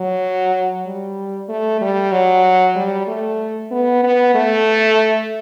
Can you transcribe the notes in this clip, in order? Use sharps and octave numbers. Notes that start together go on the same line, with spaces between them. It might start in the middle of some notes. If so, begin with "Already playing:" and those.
Already playing: F#3
G3
A3
G3
F#3
G3
A3
B3
B3
A3